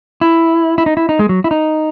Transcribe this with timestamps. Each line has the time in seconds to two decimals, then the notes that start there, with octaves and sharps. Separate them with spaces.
0.21 E4
0.78 E4
0.86 D#4
0.97 E4
1.09 D#4
1.19 G#3
1.29 F#3
1.44 E4
1.51 D#4